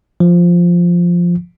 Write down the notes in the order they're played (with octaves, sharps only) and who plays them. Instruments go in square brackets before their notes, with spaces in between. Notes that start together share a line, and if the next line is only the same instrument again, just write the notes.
[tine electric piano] F3